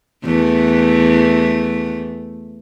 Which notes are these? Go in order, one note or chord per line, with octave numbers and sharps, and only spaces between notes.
E2 A3